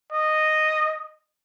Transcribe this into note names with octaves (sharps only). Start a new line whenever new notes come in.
D#5